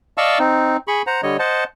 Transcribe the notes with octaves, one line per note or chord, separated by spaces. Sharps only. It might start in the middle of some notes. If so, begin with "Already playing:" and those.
D5 D#5 F5 A5 C#6 E6
C4 D#4
G#4 B5 C#6
C5 F#5 A#5
D3 G3 C#5 D#5
C5 D#5 F#5 A5